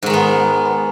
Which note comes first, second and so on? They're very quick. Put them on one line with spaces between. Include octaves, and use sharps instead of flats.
G#2 D#3 G#3 B3